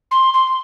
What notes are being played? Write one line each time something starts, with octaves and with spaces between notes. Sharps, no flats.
C6
C6